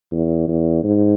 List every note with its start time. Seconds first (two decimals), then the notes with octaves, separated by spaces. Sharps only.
0.12 E2
0.48 E2
0.84 G#2